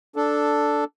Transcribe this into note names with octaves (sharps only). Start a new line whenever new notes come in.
D4 A4